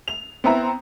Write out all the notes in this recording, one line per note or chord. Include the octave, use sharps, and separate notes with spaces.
F7
B3 C4 E4 A#5